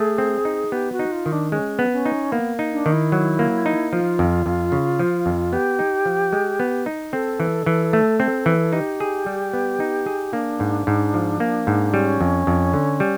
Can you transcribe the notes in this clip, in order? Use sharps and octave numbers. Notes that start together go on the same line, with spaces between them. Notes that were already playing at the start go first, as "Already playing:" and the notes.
Already playing: A3 G#4
C4
D#4
B3 G4
F#4
D#4
F4
D#3
D4
G#3 C#4
B3
C#4
D#4
A#3 B3
D#4
D4
D#3
E4
F#3
A#3
D#4
F3 F4
F2
F2
C#3
F3
F2
B3 G4
D#4
F3
G#3
B3
D#4
C4 A4
E3
E3
A3
C4
E3
D#4 G4
G#4
G3
B3
D#4
G#4
A#3 D4
G#2
G#2
F3
A#3
G#2
G3 C#4
F2
F2
D3
G3